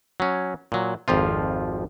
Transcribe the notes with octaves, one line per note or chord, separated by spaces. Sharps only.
F#3 C#4
A#2 F#3
G#1 F2 F3 F4